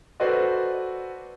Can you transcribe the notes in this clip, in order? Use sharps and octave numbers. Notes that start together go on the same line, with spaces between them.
F#4 A4 B4 C5 D5 D#5